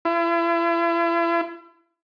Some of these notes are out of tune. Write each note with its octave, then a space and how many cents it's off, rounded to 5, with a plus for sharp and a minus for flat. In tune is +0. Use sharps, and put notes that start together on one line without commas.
E4 +40